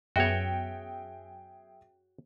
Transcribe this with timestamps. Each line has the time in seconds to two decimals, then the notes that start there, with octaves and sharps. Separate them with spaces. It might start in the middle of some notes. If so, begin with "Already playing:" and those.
0.16 F#2 B3 F#4 G#4 C#5 E5 G5